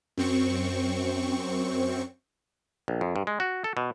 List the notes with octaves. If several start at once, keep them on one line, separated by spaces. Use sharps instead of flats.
F#2 C4 C#6
A#1
F2
G2
G#3
F#4
A4
B2